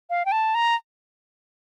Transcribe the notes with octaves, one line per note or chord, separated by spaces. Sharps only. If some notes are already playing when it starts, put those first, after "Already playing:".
F5
G5
A5
A#5